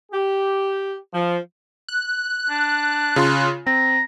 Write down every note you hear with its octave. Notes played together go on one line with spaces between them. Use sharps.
G4
F3
F#6
D4
C#3 F4 C6
C4 A#5